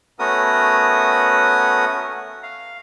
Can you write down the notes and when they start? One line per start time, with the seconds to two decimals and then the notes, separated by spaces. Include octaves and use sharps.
0.19 A3 B3 C#4 F#4 A#4 D#6
2.43 F5